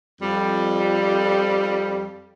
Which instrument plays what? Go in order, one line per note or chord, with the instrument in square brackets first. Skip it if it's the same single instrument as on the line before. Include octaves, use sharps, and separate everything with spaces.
[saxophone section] F2 G3